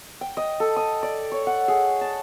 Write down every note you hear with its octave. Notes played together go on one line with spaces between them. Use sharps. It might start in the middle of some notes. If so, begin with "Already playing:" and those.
G5
D#5
A4
D#6
D5
C#5
F#5
G#4
A5